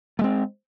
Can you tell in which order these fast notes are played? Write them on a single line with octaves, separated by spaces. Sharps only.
A3 G#3 C4